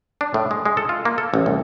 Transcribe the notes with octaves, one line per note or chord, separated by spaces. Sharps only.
D4
A2
G#3
G#3
A4
F4
A#3
A4
A1
C2